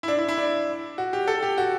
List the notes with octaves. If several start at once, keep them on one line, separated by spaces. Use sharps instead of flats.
E4
D4
E4
E4
D4
F#4
G4
A4
G4
F#4